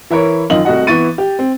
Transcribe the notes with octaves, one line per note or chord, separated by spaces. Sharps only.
E3 E4 A#4 C#5
F#2 D#3 F4 D#5 F#7
C2 A3 F#4 D#5 F#5
E3 B3 E4 C#6 A6 D#7
G4
C4